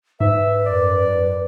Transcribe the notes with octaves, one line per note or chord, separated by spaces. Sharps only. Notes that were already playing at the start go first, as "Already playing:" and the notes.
G#2 B4 E5
F#2 D5